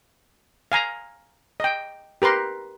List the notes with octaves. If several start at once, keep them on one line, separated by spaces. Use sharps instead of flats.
F5 G#5 A#5
D#5 G5
G4 A#4 B4 C6